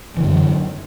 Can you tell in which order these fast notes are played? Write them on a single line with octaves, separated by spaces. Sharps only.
E3 D3 F#2 F#3